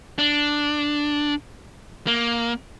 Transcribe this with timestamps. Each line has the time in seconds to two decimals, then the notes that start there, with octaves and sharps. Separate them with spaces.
0.18 D4
2.07 A#3